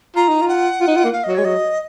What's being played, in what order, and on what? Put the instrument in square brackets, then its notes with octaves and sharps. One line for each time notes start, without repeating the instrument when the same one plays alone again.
[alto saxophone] F4 [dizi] A#5
[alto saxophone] D#4
F4
[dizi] F#5
[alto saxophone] F4
D#4
F4
A#3
[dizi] F5
[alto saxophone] F#3 [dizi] D#5
[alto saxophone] G#3 [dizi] C#5
[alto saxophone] F#3 [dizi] D#5